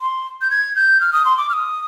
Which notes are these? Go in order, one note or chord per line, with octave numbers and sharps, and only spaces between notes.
C6
G6
G#6
G6
F6
D#6
C6
D6
F6
D#6